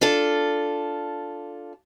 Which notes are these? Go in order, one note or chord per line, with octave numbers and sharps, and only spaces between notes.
D4 F4 A4